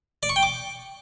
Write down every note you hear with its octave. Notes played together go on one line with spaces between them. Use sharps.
D5
C#6
G5
D6